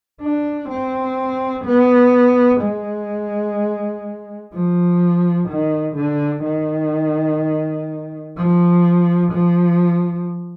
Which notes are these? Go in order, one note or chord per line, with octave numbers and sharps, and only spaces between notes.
D4
C4
B3
G#3
F3
D#3
D3
D#3
F3
F3